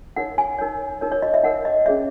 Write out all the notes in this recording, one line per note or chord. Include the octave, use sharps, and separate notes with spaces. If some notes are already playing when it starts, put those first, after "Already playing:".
D#4 A#4 C#5 F#5
G#5
D#4 A#4 C#5
D#4 A#4 C#5
C#5
D#5
E5
D#4 A#4 C#5 F#5
D#5
C#4 G#4 C#5 E5